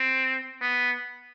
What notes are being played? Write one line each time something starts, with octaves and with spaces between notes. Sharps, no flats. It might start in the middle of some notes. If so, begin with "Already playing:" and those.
Already playing: C4
B3